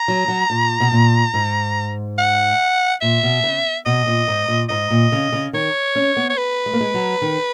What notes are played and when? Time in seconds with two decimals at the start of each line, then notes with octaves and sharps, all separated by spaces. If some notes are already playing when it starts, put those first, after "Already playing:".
Already playing: A#5
0.08 F#3
0.28 F#3
0.50 A#2
0.80 B2
0.92 A#2
1.34 G#2
2.18 F#5
3.01 A#2 E5
3.23 B2
3.44 C#3
3.86 B2 D#5
4.07 A#2
4.28 G#2
4.48 A#2
4.69 G#2 D#5
4.90 A#2
5.12 C#3
5.32 C#3
5.53 D#3 C#5
5.95 C#4
6.17 B3
6.30 C#5
6.38 B4
6.66 G#3
6.73 A#3
6.81 G#3
6.94 F#3
7.22 D#3